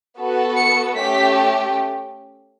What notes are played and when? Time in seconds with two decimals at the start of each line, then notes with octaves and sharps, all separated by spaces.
0.19 B3 F#4 A4
0.57 C#7
0.96 A3 C#4 G4 B6